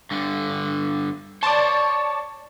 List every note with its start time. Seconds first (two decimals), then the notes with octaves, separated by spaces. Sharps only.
0.11 G2 D3
1.43 C#5 D5 A5 C6